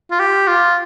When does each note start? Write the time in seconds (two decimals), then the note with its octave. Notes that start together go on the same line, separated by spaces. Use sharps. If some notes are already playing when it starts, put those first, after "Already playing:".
0.11 F4
0.19 G4
0.47 F4